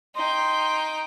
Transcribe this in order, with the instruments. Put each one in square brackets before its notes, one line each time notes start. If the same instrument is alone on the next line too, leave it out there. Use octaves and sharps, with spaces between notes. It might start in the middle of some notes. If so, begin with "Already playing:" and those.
[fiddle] D#4 G5 [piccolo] C6